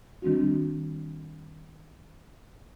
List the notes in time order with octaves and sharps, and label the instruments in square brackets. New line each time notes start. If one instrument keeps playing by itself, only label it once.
[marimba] D#3 G3 C4 D4 F#4